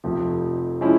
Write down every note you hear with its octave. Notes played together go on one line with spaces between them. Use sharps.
F1 F2 C3 F3
F3 G#3 C#4 E4